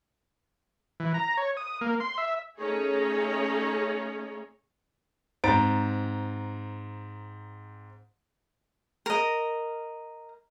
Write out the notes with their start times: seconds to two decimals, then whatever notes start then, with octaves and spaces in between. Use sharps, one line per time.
1.00 E3
1.14 A#5
1.37 C#5
1.57 D#6
1.81 A#3
2.00 C6
2.18 E5
2.59 A3 C#4 D#4 G#4 C#5
5.44 G#2 C4 A#5 A6 D7
9.06 A#4 D#5